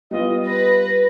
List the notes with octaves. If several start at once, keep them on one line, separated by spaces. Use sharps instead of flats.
G3 B3 F4 D#5
B4 A#6